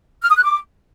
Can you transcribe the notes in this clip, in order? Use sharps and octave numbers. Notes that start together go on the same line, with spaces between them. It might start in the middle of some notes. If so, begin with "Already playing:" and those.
F6
D#6
F#6
D6